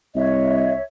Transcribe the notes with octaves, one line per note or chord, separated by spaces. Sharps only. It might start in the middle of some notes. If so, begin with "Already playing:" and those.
C2 C#5 D#5 E5